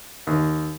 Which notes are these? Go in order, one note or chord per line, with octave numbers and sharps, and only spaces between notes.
D#2